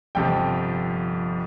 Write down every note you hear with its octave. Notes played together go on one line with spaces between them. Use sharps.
G1 F2 C3 F3 G5